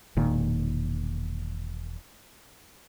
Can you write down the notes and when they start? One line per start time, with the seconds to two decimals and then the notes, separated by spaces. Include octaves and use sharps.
0.17 E1 A#2 D#3